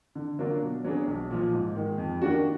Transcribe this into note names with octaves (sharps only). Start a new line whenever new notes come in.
D3
F#3 A#3 D4 F4
B2
F#3 B3 D4 G#4
B1
A#2 F3
G#2
D#3 G#3
F2
D#3 A#3 D4 F#4